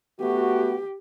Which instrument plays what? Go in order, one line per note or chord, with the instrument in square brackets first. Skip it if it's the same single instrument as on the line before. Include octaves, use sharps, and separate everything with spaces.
[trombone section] A3 B3 F#4 [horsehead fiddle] G4